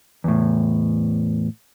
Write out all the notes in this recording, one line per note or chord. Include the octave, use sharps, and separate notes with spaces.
E2 A2